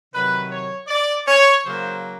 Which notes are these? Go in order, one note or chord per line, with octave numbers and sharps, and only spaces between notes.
C3 D#3 F#3 B4
C#5
D5
C#5
C#3 F#3 A#3 C5